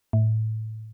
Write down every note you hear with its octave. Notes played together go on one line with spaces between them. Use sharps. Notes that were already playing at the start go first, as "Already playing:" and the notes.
A2